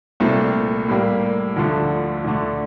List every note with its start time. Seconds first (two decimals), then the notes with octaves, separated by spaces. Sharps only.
0.20 C2 A#2 A3 C4
0.88 A2 G3 A#3
1.56 D2 D3 F3 A3
2.24 D2 D3 A3